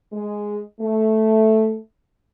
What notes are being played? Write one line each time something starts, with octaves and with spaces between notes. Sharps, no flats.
G#3
A3